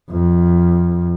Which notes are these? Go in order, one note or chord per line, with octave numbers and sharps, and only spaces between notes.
F2